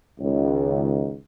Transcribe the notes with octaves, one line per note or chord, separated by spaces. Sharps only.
C#2 D#3